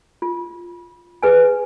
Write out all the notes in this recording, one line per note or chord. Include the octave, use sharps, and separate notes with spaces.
F4
G#4 B4 G#5